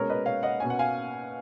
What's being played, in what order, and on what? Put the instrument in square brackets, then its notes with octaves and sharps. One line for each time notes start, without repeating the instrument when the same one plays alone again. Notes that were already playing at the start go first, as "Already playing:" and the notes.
Already playing: [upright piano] B2 G#3 C#4 A#4 C#5
B4 D#5
C#5 F5
D#5 F#5
B2 A#3 C#4 G#5
F#5
F5 G#5